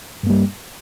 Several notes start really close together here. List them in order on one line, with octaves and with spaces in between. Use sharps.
G2 A#3 G3